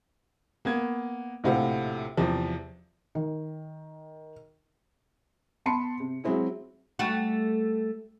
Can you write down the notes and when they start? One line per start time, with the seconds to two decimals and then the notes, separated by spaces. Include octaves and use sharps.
0.65 A#3 B3 G#6
1.44 A#1 A2 C3 F#4 F5
2.17 E2 C3 F3
3.15 D#3
5.66 B3 A5 B5 C6 C#7
6.00 C3
6.24 F#3 G#3 C4 E4 G#4
6.99 G3 A3 F#4